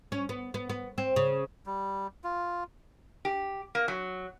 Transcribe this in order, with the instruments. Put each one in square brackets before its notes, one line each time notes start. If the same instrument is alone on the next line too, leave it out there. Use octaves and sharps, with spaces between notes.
[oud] C#4
B3
B3
B3
C4
C#3
[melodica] G3
F4
[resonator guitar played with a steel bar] G4
A#3
F#3